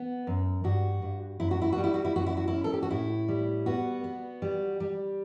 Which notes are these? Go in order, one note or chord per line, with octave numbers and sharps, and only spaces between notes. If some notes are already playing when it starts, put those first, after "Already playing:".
Already playing: B3
F#2
G2 F#4
G2
F#2 E4
F#4
E4
F#4
G3
E4
F#4
E4
F#2 F#4
E4
F#4
E4
C#4
A4
G4
F#4
A2 E4
G3
B3 F#4
B3
G3
G3